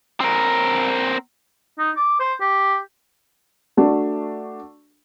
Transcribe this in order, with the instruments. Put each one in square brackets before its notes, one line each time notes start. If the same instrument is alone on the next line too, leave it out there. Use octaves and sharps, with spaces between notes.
[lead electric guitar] C4 A#4
[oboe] D#4
D6
C5
G4
[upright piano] A3 D4 F#4